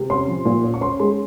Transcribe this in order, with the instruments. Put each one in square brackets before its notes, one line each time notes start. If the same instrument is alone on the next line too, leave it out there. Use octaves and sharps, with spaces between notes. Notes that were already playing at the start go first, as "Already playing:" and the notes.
Already playing: [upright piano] C3
C#4 C6
F3
A#2
C#4
C#6
C#4 C6
G#3 C6